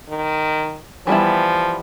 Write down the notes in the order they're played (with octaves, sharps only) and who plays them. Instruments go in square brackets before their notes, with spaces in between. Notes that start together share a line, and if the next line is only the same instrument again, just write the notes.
[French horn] D#3
[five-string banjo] E3 G3 B3 E4 [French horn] F3